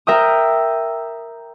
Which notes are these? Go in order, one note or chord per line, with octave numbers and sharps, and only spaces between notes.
A#4 E5 G5 D#6